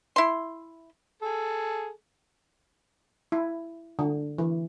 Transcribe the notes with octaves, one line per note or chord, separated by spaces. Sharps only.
E4 C6
G#4 A4
E4
D3
E3